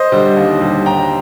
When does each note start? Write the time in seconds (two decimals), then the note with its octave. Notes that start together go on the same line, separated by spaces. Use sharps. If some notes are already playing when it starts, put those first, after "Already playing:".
Already playing: C5 D#5
0.12 D3 G3
0.37 D#2
0.61 D3 G3
0.86 D#2 G5 A#5